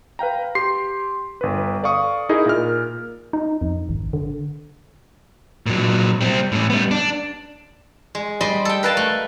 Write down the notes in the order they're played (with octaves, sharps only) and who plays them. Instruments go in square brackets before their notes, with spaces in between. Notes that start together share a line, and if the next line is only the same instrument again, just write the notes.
[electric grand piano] B4 F5 G5 A#5
G4 C6 C7
G1 B4
A4 D5 F5 C#6 D#6
D#4 E4 G#4 A#4 D#5
A#2 A#4 F6
[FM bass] D#4
F2
G#1
D3
[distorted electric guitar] A#2 F#3
G3 C4
A2 C#4
G3 B3
D4
[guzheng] G#3
G3 D#5 B5 C6
A4 G5
A#4 B4 F5 G5 A5
A3